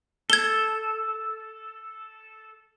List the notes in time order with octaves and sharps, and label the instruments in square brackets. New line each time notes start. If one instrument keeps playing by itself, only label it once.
[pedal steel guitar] A4 [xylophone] G#6 G7